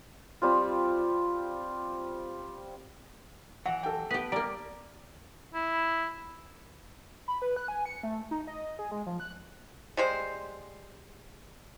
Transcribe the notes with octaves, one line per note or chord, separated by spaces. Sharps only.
G3 C4 F4
E3 F#3 F#5
A4 G5
B3 G4 B4
G3 A#3 D5 A#5
E4
B5
B4
F#6
G#5
C#7
A3
D#4
D#5
G#4
G#3
F3
F#6
G3 G#3 C5